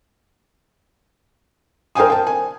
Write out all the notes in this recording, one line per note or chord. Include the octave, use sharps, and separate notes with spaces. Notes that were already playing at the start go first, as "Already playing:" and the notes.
A#4 C5 G5 G#5 D#6
G5 A5
G#5